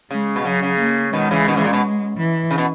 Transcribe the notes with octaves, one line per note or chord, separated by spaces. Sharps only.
C#3 G#3
B2
C#3 F#3
C#3
A#3
B2 D#3 G#3
C#3 E3
B2 D#3
C#3 E3
A#2
B2
E3
C#3
B2